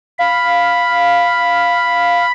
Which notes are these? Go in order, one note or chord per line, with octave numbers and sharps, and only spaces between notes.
F5 B5